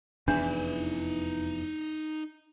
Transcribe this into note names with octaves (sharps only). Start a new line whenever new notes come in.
F1 E2 E3 D4 D#4 E5